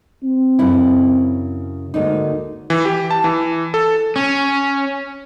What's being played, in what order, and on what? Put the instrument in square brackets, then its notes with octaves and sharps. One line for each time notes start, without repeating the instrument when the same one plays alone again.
[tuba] C4
[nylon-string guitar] F#2 C#3 E4
[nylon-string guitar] D2 A#3 D#4 [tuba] G#2
[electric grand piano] E3
G4
A5
E3
A4
[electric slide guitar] C#4